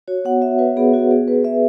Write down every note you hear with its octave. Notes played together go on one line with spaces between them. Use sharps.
F#4 C#5
B3 F#5
F#4 E5
F#4 B4
B3 G#4
B3 F#4
B3 G#4
B3 B4
B3 E5